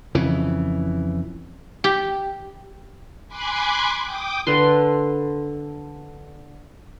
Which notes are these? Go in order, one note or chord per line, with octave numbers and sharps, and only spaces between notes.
F2 C#3 E3
G4
G#5 B5 C6 D6 F#6 G#6
G5 D6 D#6
D3 B4 C6